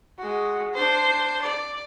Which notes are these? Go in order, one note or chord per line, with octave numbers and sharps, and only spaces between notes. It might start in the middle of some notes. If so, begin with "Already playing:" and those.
G#3 F#4
D4 C5
D5